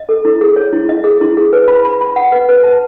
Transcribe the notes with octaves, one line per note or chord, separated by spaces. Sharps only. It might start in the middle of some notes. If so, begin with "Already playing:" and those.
Already playing: D#5
A4
E4
G#4
C#5
E4
D#5
G#4
E4
G#4
B4
B5
B5
B5
F#5
B4
B4
A5